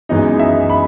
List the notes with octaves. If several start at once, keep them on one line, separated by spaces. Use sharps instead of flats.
F#2 E3 G#3 B3 D#4 D#5
E5
B5